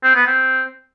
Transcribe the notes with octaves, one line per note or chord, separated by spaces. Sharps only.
C4
B3
C4